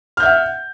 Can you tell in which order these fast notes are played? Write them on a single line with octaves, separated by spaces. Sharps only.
F6 G6 E5 F#5